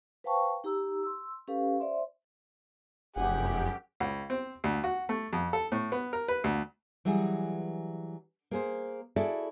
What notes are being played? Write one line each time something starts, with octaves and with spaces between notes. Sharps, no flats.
B4 C5 F5 G5 A5 C#6
D#4 G4 A#5 E6
C6 E6
C#4 G4 A4 B4 F5
C5 D5 E5 C6
F1 F#2 G4 G#4 F#5
C#2
C4
D2
F#4
A3
F2
A4
A2
B3
A#4
B4
D2
E3 F#3 G3 E4 G#4
A#3 G#4 C5
E4 F#4 G#4 A4 D5 E5